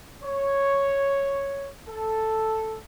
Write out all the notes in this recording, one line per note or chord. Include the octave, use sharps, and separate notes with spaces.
C#5
A4